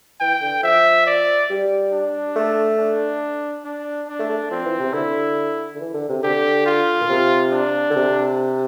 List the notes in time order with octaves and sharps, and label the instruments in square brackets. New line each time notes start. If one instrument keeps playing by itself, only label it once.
[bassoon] E3 [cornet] G5
[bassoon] D3
[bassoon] F3 [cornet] E5
[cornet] D5
[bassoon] G3
[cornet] D4
[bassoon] A3
[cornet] D4
D4
D4
[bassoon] A3
A3
[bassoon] F3 [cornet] C4
[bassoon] E3
C3
[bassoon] D3 [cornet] E4
[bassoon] D3
E3
D3
C3
[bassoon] D3 [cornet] G4
[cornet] F4
[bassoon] A#2
C3
[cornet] D4
[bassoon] D3
C3